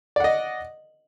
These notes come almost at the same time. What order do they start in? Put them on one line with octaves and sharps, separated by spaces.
D5 F#5 D#5